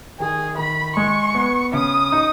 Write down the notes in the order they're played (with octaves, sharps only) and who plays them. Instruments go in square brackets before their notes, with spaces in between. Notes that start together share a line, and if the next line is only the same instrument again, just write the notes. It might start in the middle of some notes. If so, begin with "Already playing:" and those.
[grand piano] D#3 [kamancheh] G#4
[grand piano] D#3 [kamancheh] B5
[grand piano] G#3 [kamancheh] C#6
[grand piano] B3
[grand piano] C#3 [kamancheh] D#6
[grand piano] D#4